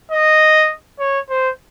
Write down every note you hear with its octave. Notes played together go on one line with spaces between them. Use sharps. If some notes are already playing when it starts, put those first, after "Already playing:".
D#5
C#5
C5